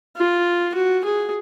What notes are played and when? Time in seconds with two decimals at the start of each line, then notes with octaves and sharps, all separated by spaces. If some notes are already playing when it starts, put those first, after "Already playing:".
0.17 F4
0.74 F#4
1.05 G#4